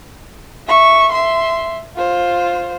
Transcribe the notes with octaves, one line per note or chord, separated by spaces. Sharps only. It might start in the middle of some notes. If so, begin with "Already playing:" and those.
E5 C#6
E5 C6
F4 C5